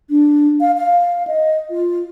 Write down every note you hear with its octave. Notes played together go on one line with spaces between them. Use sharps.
D4
F5
F5
D#5
F4